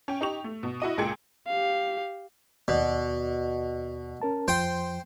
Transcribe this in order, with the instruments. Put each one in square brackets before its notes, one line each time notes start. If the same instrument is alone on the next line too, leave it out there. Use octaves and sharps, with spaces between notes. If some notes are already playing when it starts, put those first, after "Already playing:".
[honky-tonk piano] C#4 G5
D#4 G4 C#6 F7
A3
B2
E4 F#4 D#5 D#7
C#2 A#2 G#4 G5 G#6 C#7
[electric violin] G4 F5
[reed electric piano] D#2 D5 [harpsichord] B2
[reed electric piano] C#4 A#4 A5
[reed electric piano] F2 F3 [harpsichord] C5 G5